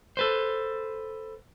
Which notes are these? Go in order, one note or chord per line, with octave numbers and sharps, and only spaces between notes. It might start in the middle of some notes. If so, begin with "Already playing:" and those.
A4 B4 C5